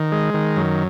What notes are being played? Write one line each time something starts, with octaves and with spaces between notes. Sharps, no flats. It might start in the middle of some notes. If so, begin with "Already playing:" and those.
Already playing: D#3
G#3
D#3
F#2